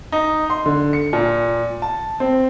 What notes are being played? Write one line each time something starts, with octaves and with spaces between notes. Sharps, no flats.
D#4
C6
D3
C#7
A#2
A5
C4